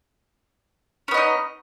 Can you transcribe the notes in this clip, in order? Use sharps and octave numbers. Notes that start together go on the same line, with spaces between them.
B3 C#4 D#4 D#5